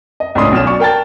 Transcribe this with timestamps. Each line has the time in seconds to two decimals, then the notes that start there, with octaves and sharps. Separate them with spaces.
0.20 D#5
0.35 C#2 A2 C#4 D4 C6 D#6
0.51 B1 B2 C#4 F6 E7
0.66 D5 C#6
0.80 A#4 G5 A5 A6